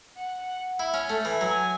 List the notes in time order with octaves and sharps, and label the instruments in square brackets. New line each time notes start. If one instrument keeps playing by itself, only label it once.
[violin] F#5
[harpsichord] E4
C#4
A3
E3
[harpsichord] F#3 [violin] G#5